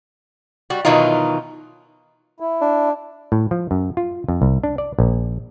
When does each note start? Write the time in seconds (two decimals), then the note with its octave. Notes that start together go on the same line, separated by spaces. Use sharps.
0.70 G3 F#4
0.85 B2 D#3 E3 F#3 D#4 F4
2.40 E4
2.62 D4
3.32 A2
3.51 F3
3.71 F#2
3.97 F4
4.28 F2
4.42 C2
4.64 D4
4.78 D5
4.99 A#1